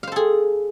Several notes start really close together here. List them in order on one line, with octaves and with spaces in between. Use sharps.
F5 C5 A4 G#4